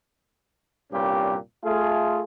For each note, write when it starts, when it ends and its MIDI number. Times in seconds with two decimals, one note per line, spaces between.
0.93 1.36 36
0.93 1.36 43
0.93 1.36 46
0.93 1.36 55
0.93 1.36 61
0.93 1.36 67
1.64 2.22 57
1.64 2.22 65
1.64 2.22 68